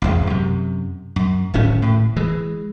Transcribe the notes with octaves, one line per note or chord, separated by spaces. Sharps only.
A1 E2 G#3
F#2 C3
F#2
D1 G#1 A2 C#4
A2
E3 G#3